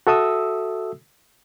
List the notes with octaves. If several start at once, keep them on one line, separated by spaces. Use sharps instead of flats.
F#4 A4 E5 D#6 E6